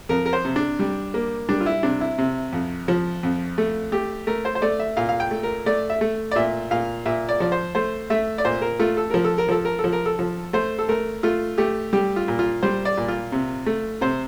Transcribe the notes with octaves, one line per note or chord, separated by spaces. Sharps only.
F2 A#4
A#4
C5
C3
D4
G3
A#3
G3 D4
F4
E4
C3 D4
E4
C3
F2
F3
F2
A3
A3 G4
A3 A#4
C5
C5
A3 D5
E5
A#2 F5
F5
G5
A3
A#4
A3 D5
E5
A3
D5
A#2 E5
A#2 F5
A#2 E5
D5
F3 D5
C5
A3 C5
A3 E5
D5
A#2 C5
A#4
A3 F4
A4
F3 A#4
A4
A#4
F3 A4
A#4
A4
F3
A#4
A4
F3
A3 C5
A4
A3 A#4
A3 F4
A3 G4
G3 G4
F4
A#2
F4
G3 C5
D5
A#2
F4
C3
A3
C3 C5